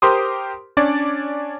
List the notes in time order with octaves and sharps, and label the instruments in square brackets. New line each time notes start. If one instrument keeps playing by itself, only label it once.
[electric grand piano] G4 A#4 C5 C6 D6 D#6
C#4 D4 C#5 D5